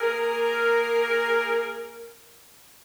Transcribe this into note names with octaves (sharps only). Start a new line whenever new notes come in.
A#3 G#4 A#4